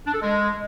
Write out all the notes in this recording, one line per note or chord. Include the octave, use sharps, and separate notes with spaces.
D4
A4
G#3